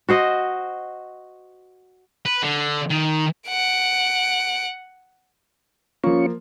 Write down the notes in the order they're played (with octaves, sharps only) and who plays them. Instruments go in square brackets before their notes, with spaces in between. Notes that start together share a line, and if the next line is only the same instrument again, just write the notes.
[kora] F#4 C5 D#5
[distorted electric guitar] B4
D3
D#3
[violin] F#5 D7
[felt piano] F3 A#3 [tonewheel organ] C#4 F4 C#6